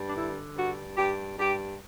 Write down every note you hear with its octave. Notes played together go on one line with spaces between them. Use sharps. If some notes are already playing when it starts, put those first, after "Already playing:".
Already playing: G2
D4
D3 E4
G2 F#4
G2 G4
G2 G4